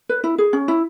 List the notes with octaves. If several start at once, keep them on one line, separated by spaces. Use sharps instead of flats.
B4
E4
G#4
C#4
E4